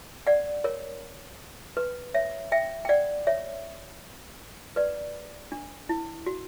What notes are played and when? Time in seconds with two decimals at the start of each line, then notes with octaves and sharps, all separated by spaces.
0.27 D5 F#5
0.64 A#4 C#5
1.77 B4
2.14 C#5 E5
2.52 E5 G5
2.85 G5
2.89 D5 F#5
3.27 C#5 E5
4.76 B4 D5
5.52 D4
5.89 E4
6.26 F#4